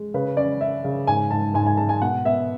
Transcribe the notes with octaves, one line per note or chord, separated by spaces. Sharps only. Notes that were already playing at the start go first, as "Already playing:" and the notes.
Already playing: G#3
C#3 B4
C#4 D5
C#4 E5
C#3
G#2 G#5
G#2 A5
G#2 G#5
G#5
G#3 A5
G#5
B2 F#5
B3 E5